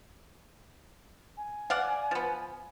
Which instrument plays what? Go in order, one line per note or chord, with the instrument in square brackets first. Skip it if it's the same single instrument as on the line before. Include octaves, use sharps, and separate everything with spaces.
[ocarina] G#5
[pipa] D5 F5 F#5
F3 B3